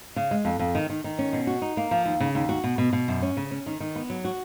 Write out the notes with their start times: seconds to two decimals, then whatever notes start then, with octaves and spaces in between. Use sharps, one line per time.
0.16 C#3
0.31 G#3
0.45 F2
0.59 F2
0.75 D#3
0.90 D#3
1.04 D#3
1.19 C#4
1.33 B2
1.47 F#4
1.62 D#4
1.77 A#3
1.91 F3
2.06 D#2
2.20 C#3
2.35 D#2
2.49 F#4
2.64 B2
2.78 B2
2.93 B2
3.08 F#2
3.23 C#4
3.37 C#3
3.51 C#4
3.66 D#3
3.80 D#3
3.96 B3
4.10 F#3
4.25 F#4